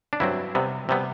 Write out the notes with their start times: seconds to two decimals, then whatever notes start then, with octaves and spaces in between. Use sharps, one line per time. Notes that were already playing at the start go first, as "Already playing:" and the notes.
0.13 D4
0.20 G2 F#3 C4 E4
0.55 C3 G3 B3
0.89 C3 G3 B3